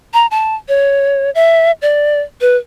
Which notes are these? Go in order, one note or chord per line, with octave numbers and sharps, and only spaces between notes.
A#5
A5
C#5
E5
D5
B4